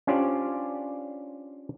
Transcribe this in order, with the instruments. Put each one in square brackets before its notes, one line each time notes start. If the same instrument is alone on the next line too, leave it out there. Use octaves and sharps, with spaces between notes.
[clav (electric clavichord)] C#4 D4 F4 G4 C5 D5